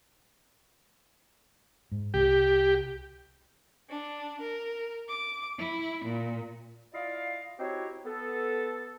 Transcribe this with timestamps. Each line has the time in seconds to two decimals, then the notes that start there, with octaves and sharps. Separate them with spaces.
1.92 G#2
2.14 C2 G4
3.88 D4
4.40 A#4
5.07 D6
5.59 E4
6.05 A#2
6.94 E4 F4 D5 D#5 F5
7.59 C4 D#4 E4 F#4 G4 C#5
8.06 B3 A4